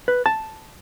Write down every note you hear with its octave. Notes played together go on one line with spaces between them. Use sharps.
B4
A5